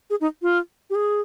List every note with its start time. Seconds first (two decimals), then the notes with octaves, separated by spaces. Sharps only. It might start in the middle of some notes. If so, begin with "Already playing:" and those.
0.10 G#4
0.21 D#4
0.42 F4
0.90 G4
0.95 G#4